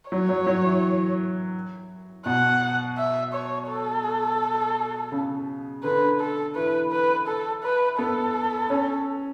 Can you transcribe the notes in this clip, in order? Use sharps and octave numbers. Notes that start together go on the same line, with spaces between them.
F#3 C#5
F#3
F#3
E3
B2 F#5
E5
C#5
A4
C#3
D3 B4
A4
E3 B4
B4
A4
B4
B3 A4
C#4